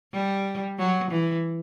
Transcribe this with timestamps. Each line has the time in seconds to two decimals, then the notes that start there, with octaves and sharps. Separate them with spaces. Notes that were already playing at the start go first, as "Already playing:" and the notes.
0.13 G3
0.78 F#3
1.10 E3